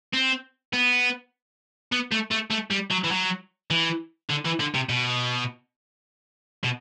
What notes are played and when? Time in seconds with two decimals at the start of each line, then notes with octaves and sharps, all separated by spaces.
0.13 C4
0.73 B3
1.92 B3
2.12 A3
2.31 A3
2.51 A3
2.71 G3
2.91 F#3
3.04 E3
3.11 F#3
3.71 E3
4.30 D3
4.45 E3
4.60 D3
4.74 C3
4.89 B2
6.64 B2